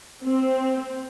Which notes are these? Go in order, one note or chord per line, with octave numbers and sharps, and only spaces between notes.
C4